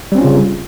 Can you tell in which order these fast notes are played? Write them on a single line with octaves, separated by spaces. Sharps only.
G3 C4 C#4 F4 C#3